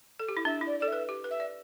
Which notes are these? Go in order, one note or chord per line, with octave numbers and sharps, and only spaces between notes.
A4
G4
E4
D4 E5
E4 D5
A4 D5
E5
B4
G4
B4
E5
D5